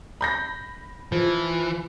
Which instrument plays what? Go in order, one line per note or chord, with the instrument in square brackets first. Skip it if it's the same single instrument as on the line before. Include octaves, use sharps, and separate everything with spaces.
[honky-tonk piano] B5 G6 A#6
[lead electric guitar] E3 [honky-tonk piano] F3